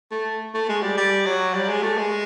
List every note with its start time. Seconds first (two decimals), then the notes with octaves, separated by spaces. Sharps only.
0.11 A3
0.54 A3
0.69 G#3
0.82 G3
0.97 G3
1.26 F#3
1.54 G3
1.69 G#3
1.82 A3
1.98 G#3